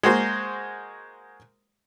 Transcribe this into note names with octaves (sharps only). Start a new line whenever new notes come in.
G#3 A#3 F#4 C5